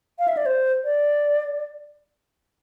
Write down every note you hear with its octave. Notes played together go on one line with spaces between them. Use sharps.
F5
E5
D5
C5
D5